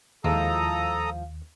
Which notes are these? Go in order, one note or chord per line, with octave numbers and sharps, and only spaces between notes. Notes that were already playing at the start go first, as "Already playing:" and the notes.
D#2 F3 G#3 E4 A4 A#5 D#6